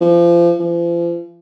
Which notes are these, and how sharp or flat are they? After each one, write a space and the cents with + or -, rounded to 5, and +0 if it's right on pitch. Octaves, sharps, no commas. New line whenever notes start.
F3 -30
F3 -40